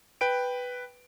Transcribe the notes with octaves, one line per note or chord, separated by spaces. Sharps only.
B4 G5 D7